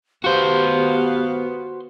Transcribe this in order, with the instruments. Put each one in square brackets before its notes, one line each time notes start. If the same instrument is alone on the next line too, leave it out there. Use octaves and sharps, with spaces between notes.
[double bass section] B3 [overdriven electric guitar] F#4 C5 [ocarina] G4 [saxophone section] F5